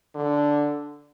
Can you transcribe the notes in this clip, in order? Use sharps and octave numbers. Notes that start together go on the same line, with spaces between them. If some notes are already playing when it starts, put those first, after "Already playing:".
D3